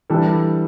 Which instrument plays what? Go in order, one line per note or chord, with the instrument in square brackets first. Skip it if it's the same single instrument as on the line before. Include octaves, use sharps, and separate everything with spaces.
[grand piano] E3 [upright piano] G3 D4 A4